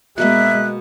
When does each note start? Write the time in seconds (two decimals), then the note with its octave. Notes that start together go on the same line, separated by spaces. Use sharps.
0.18 B2 G#3 A#3 B4 E5 F#6